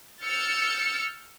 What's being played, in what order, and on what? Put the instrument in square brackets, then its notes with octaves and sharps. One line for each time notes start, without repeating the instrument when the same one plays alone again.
[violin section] E6 F6 G6 A6 C#7